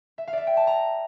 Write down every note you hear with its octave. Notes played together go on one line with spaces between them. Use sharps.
E5
F5
D5 E5
G5
A5
A#5